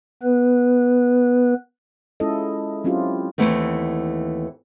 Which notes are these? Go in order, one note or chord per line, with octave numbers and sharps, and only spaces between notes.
B3 B4
G#3 C#4 E4 F4 A4 D#5
F#3 C4 C#4 E4 F4 G4
D#2 B2 E3 A3 B3 C4